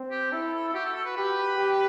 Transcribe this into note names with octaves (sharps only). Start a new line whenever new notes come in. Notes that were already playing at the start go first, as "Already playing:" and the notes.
Already playing: C4
G4
E4 A4
A4
A4
F#4 G4
A4
A4
B4
G4 B4
G4